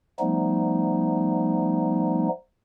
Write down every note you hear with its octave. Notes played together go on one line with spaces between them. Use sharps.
F3 G3 A3 B3 D#4